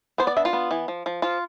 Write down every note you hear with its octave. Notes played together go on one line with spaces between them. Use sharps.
B3 C5
D5
D4 E5
F4
B3
E3
F3
F3
F3 F4